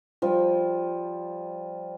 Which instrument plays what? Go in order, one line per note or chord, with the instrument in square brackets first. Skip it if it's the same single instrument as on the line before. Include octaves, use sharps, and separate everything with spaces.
[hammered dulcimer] F3 G3